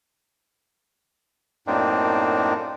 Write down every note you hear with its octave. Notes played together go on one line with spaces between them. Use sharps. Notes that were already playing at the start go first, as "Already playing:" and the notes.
F#2 A2 A#3 C4 D4 D#4